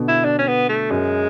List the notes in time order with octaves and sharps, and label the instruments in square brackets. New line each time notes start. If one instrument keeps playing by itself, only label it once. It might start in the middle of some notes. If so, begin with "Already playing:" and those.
Already playing: [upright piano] B2 D3
[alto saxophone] E4
D4
C#4
B3
A3
[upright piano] F#2 [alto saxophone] G#3